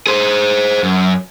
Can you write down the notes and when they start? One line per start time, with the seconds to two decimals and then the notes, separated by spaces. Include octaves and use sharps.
0.07 G#4 C5
0.83 F#2